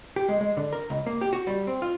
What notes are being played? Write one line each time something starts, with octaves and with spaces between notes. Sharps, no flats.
G4
G#3
G#3
D3
A#4
C#2
A#3
G4
F#4
G3
C4
F4